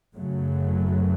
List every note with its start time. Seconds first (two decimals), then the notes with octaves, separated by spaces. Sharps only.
0.15 F#2 C#3 F#3 A3